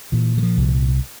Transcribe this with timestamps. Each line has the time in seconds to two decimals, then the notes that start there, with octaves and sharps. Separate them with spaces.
0.12 A#2 E3
0.37 E3
0.43 F3
0.57 C2